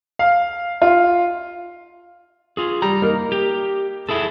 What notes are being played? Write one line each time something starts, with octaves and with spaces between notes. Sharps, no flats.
F5
F4
F4 G#4
G3 A#5
A#3 D#4 A#4
G4
E4 G#4 A4